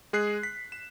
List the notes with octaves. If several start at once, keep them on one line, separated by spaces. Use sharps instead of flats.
G#3 G#4 F#6 C7
B6
E7